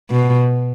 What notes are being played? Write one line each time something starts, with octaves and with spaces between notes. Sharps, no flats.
B2